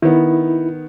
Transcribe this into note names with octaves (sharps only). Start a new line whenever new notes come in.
D#3 B3 E4